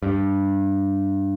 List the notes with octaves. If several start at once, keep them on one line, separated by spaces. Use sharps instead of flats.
G2